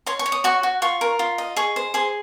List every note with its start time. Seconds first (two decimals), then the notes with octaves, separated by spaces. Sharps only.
0.06 C#5 C6
0.19 C#6
0.26 C#5
0.32 D#6
0.44 F#4 C#6
0.63 F#4
0.82 F4 C#6
1.01 A#4
1.19 F4
1.38 D#5
1.56 G#4 C#6
1.76 C5
1.94 G#4 C6